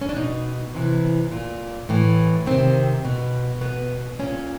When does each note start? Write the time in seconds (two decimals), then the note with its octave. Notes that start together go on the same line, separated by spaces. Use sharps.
0.01 C#4
0.09 D4
0.17 B2 D#4
0.75 C3 E3
1.32 A#2
1.89 A2 E3
2.46 C3 D#3 C4
3.04 B2
3.61 B2 B3
4.19 A#2 C#4